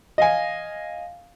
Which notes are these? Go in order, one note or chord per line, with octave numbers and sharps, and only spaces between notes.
D#5 F5 G#5